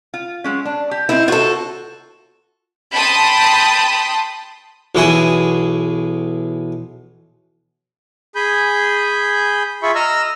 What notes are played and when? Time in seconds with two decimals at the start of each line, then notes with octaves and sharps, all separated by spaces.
0.14 F4
0.44 F#3 G#3 C#4
0.65 D4
0.91 G4
1.09 C4 E4 G4 D#5
1.28 F4 F#4 A4
2.92 G5 A5 B5 C6 D#6
4.95 B1 E3 F#4 G#4
8.35 G#4 G#5 B5 G6
9.83 F4 G#4 E5 B5 C#6
9.95 D#5 A#5 E6 F6